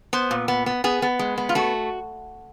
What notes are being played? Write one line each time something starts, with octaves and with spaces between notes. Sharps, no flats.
B3 C5
A#2
B3
B3
B3 G#4
B3
G#3
B3
F4
A3 F#4